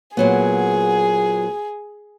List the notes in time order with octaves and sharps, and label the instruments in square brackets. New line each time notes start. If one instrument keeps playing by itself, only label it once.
[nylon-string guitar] A#2 F#3 B3 [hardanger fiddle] G#4